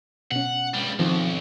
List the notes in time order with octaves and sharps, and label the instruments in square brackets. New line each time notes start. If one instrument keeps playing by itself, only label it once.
[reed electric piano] B2 C#4 [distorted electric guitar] F#5
[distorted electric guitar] C#2 G3
[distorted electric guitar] B1 [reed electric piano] D#3 F3 C4